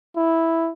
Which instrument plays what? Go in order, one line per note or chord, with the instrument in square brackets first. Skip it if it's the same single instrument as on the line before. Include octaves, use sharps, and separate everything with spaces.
[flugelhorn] E4